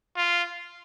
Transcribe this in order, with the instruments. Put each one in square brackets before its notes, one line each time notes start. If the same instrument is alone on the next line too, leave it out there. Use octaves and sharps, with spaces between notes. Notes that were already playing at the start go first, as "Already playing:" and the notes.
[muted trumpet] F4